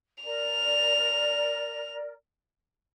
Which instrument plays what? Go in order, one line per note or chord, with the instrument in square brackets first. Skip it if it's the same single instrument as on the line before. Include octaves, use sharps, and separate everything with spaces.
[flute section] A#4 D5 [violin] F7